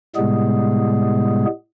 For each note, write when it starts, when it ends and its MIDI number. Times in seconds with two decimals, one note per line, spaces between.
0.16 1.45 45
0.16 1.45 48
0.16 1.45 55
0.16 1.45 56
0.16 1.45 59
0.16 1.45 68